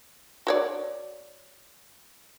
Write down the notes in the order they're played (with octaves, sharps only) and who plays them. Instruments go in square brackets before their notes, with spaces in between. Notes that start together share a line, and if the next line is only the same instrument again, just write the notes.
[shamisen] F#4 C#5 D5